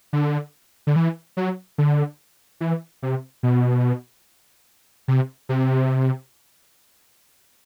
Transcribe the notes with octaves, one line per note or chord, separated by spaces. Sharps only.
D3
D3
E3
F#3
D3
E3
C3
B2
C3
C3